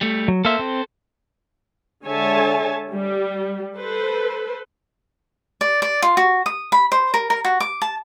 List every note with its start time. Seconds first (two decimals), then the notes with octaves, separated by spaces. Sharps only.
0.01 G3 A3
0.28 F#3
0.45 A#3 A4 C5 E5
0.59 C4
2.06 D3 G#3 C#5 E5 G#5 A5
2.93 G3
3.78 A4 B4 C5
5.61 D5
5.82 D5
6.02 F4
6.17 F#4
6.46 D#6
6.72 B5
6.92 C5
7.14 A#4
7.30 A#4
7.45 F#4
7.60 D6
7.82 A5